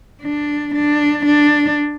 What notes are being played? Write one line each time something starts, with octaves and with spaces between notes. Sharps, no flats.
D4
D4
D4